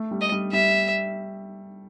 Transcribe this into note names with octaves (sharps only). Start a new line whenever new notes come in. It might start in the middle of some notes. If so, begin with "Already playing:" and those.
Already playing: A3
G3
D#5
G3
G3 E5